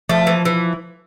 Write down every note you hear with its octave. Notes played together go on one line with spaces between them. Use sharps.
F3 A3
E3
E3